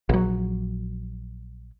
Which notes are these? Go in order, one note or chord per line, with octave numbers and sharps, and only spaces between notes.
A#1 F#3